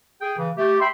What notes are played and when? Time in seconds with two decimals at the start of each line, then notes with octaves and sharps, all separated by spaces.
0.21 G#4 G5
0.38 C#3 E3
0.57 A3 G4
0.80 E5 G5 B5 C6